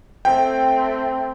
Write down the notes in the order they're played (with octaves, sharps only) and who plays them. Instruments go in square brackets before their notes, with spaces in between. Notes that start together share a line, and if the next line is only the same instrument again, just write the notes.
[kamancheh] A3 C4 [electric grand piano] G5